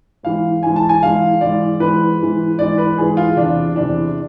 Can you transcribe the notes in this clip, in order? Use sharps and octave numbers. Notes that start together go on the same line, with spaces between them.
G#2 E3 F5
G#2 E3 G#5
A5
G#5
G#2 E3 F5
G#2 E3 D5
G#2 E3 B4
G#2 E3
G#2 E3 D5
B4
G#2 E3 G#4
F4
E2 C3 E3 D4
E2 C3 E3 D4